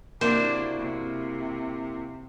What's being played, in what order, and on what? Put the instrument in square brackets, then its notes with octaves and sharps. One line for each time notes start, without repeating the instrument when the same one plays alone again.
[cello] C3 D4 [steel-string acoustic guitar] A#3 E4 F#4 [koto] C5
[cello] C3